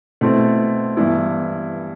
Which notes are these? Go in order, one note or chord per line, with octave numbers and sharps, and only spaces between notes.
B2 A3 C4 E4 A4
G2 E3 B3 E4